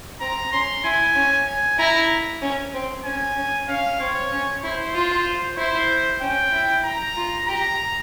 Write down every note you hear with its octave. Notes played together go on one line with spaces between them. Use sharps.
C4 A#5
C#4 C6
E4 G#5
C#4
G#5
E4 A#5
C#4
C4
C#4 G#5
C#4
C#4 F5
C4 C#5
C#4
E4 C5
F4
E4 C5
C#4 G5
E4
A#5
F4
G4 A#5